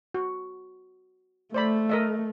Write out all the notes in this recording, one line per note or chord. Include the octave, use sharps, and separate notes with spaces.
F#4
A3 C5 D5 B5
A#4 D#5 E5